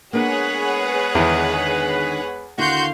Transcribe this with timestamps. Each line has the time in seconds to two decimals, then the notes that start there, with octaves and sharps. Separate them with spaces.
0.13 G#3 A#3 B3 D4 G#4 B4 C#5 F#5
1.15 E2 D3 D#3
2.58 D#2 D3 E4 F#4 F5 C6 G6